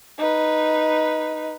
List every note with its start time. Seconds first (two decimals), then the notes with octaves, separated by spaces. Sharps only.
0.18 D#4 B4